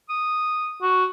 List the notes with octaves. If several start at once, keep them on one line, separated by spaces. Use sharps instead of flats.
D#6
F#4